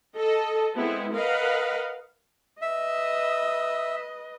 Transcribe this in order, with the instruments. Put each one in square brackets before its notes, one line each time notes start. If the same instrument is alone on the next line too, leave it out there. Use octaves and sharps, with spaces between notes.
[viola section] A4 D#5
G#3 B3 C4 E4
A#4 B4 D#5 F5 F#5
[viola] B4 D#5 [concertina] E5